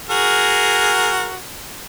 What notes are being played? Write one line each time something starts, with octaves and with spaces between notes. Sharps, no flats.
F#4 G#4 A#4